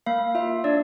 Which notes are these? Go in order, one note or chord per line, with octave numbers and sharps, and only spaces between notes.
A#3 F5
F4 E5
D4 D5